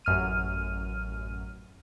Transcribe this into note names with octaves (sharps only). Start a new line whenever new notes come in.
A1 F#2 F6 D#7